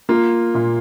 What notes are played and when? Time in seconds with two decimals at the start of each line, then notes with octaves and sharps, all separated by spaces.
0.09 A#3 F4
0.54 A#2